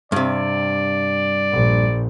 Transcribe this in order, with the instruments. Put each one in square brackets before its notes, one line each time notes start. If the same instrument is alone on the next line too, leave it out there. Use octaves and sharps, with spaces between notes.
[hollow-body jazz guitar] G2 C3 [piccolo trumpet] D5
[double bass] A#1